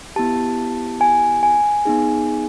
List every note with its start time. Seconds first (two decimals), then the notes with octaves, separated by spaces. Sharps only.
0.16 B3 E4 G4 A5
1.01 G#5
1.43 G#5
1.85 B3 D#4 G#4